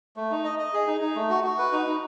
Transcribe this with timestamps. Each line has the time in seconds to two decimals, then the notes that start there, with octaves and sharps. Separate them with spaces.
0.16 A3
0.31 D#4
0.44 D#5
0.59 D#5
0.73 G#4
0.87 D#4
1.01 D#4
1.15 A3
1.30 F#4
1.44 F#4
1.58 B4
1.72 D#4
1.86 D#4